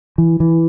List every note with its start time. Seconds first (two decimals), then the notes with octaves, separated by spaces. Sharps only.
0.18 E3
0.40 E3